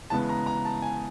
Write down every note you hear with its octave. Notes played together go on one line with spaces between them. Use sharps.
C#3 E3 G#3 B3 A5
A#5
A#5
A5
G#5